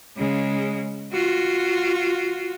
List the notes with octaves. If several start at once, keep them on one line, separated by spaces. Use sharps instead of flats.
C#3 G#3
F4 F#4